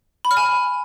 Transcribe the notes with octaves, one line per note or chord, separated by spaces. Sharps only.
B5
F6
G#5